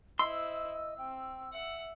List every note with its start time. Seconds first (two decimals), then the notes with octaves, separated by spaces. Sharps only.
0.19 E4 C5 D#5 C6 E6
0.98 C4 G5
1.53 E5 F#5